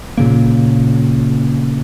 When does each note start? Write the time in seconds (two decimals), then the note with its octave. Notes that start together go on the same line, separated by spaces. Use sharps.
0.17 A#2 C#3 A#3